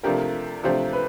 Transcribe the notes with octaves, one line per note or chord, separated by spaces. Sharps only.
C3 F3 A3 D4 G4 A#4
C3 F3 A3 D4 G4 C5
B4